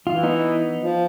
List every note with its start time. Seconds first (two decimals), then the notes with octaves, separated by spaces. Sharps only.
0.07 E3 F4
0.23 B3 D#4
0.78 F3